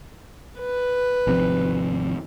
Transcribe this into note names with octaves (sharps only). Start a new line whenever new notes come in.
B4
G#1 C3 F3